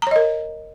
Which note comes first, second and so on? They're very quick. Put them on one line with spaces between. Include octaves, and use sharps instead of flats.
A#5 C#5 D#5 A#4